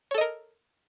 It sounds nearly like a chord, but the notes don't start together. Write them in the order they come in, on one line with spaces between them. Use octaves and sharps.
C#5 A4 D#5 A#4